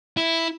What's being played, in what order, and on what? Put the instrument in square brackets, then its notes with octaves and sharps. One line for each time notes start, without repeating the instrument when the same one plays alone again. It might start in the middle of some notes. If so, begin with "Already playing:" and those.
[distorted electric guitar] E4